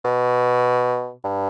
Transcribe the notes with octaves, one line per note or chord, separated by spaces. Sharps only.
B2
G2